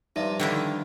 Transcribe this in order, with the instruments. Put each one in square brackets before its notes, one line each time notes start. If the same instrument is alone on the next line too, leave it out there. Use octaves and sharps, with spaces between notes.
[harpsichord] G2 C3 F3 [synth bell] D#4 D5 E5
[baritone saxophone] D3 [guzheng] D#3 A#3 E4